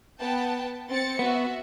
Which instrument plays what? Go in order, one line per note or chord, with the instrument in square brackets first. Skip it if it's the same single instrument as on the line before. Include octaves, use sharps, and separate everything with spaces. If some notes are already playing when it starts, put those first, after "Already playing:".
[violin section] B3 G5 A5
C4 A6 C#7
[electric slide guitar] B3 [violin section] F#4 E5